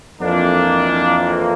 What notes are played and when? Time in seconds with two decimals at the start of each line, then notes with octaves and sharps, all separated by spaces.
0.21 F2 E3 A#3 D4